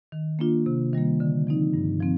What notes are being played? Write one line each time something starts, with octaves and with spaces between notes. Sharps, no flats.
D#3
A#3 D4 F4
C3
D#3 G3 A#3
D3
F3 C4 D#4
G2
F3 C4